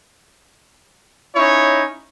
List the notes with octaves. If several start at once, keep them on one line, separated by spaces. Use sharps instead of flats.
C#4 D#4 E4 C#5